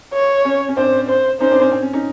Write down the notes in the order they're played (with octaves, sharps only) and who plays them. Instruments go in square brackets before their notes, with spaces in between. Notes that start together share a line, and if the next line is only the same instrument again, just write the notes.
[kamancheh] C#5
[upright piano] C#4
C#4
[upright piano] C4 D4 [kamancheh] C5
[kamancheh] C5
[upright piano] C#4 D#4 [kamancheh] C5
[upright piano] C4 D4
C#4
C4
C#4
C#4 D#4